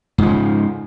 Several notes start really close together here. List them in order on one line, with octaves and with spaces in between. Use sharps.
G#2 F3 C#3